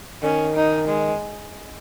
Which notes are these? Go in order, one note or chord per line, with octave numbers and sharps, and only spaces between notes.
D#3 C#4
D#4
G#3